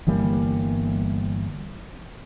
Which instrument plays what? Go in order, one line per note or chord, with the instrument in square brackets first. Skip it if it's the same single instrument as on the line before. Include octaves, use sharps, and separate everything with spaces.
[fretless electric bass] G1 E3 G3 A#3